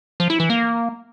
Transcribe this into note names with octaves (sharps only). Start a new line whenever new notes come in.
F3
E4
E3
A#3